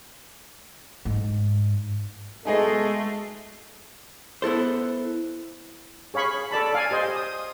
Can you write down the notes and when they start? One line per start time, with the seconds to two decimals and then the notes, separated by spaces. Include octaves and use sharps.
1.05 G#2
2.45 B2 G#3 A3 D#4 G#4 A4 D#5
4.42 B3 E4 A4 C5
6.14 G#4 C#5 F5 B5 C#6
6.51 A4 D5 A5 B5
6.72 D5 F5 G#5
6.91 G4 C5 D#5 G#5
7.16 D#6